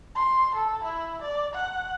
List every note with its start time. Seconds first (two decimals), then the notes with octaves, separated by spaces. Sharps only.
0.15 C6
0.55 A4
0.84 E4
1.22 D5
1.54 F#5